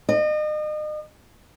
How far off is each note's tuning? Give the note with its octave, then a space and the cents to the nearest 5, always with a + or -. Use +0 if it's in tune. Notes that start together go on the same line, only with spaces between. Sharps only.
D#5 -35